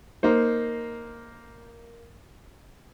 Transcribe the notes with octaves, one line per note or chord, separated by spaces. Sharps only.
A#3 D#4 C5